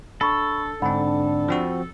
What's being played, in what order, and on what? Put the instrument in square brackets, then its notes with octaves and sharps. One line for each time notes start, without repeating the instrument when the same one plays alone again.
[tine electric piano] D4 [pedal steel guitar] A4 [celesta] B5 C#6
[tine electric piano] G#2 D3 C4 [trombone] D4 [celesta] F#5 B5
[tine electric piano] F3 C4 F#4